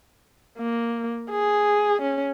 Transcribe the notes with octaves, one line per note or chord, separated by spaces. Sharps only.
A#3
G#4
C#4